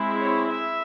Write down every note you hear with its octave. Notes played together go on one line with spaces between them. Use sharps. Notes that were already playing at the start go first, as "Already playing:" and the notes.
Already playing: G#3 C4 E4
C#5
E5